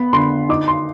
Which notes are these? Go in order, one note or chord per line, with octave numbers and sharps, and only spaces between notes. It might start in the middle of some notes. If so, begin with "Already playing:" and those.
Already playing: B3 B5
D3 C6
D#4 D6
C6